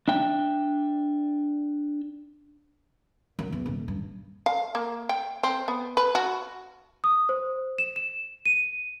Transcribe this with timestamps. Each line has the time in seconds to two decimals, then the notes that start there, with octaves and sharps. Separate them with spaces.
0.08 D4 E5 G5
3.39 F#2
3.52 E2
3.66 D#1
3.88 G2
4.46 F5
4.75 A#3
5.09 G5
5.43 C4
5.68 B3
5.97 B4
6.15 F#4
7.04 D#6
7.29 C5
7.78 E7
7.96 E7
8.46 D#7